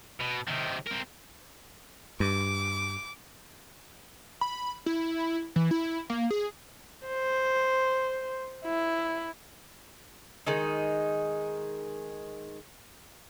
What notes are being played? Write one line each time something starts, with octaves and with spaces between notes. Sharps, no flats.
B2
C3 D#3
C4 A#4
G2 D6
B5
E4
E3
E4
A#3
G#4
C5
E4
D#3 G#3 D#4